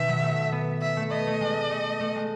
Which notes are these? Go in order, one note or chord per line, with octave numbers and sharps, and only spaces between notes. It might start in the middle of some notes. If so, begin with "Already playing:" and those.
Already playing: B2 D#3 E5
F#3
A3
B3
E5
A3
B3 D#5
A3
G#3
A3
A3
G#3